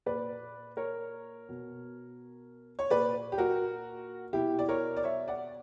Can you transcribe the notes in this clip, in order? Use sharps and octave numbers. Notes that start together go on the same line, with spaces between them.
A#2 B4 D5
A#4 C#5
B2
C#5
A#2 B4 D5
G4
F#4 A#4
B2 E4 G4
D5
A#4 C#5
D5
C#5 E5
D5 F#5